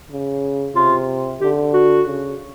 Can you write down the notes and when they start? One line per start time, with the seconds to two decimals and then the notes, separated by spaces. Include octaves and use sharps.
0.11 C#3
0.75 C3 F4
1.40 D3 G4
1.73 F#4
2.05 C#3